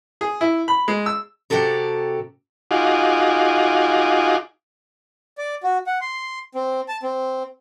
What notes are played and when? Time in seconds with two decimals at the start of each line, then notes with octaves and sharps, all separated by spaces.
0.21 G#4
0.41 E4
0.68 B5
0.88 G#3
1.06 E6
1.50 C3 F#4 G4 A4 A#5
2.71 D#4 F4 F#4 G#4 D6
5.38 D5
5.63 F#4
5.86 F#5
6.01 C6
6.55 C4
6.88 A5
7.03 C4